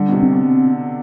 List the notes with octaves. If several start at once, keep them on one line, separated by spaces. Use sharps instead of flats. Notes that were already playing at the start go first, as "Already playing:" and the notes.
Already playing: D3 G3
B2
C3
C4
B2